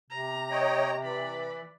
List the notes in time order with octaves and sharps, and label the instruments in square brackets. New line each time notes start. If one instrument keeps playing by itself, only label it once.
[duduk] C3 [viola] A#5
[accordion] C#5 D#5 G5
[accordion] E3 [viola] D5 B5